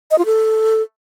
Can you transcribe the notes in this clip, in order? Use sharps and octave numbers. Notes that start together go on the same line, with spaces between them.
D#5
F4
A4